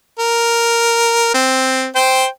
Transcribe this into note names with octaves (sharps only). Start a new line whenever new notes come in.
A#4
C4
C5 G5